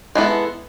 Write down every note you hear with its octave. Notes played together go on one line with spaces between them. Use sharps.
G#3 B3 E4 A4